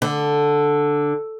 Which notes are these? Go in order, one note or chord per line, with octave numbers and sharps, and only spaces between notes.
D3